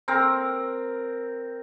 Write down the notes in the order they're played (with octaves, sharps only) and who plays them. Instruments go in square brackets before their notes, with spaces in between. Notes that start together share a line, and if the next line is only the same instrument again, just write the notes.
[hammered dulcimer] C4 A#4